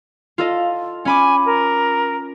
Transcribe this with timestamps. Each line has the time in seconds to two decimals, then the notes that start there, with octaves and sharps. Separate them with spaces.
0.38 F4 A4 D#5
1.05 C#4 G#5 B5 D6
1.46 A#4